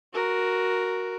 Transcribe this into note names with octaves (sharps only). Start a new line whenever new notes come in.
F#4 A#4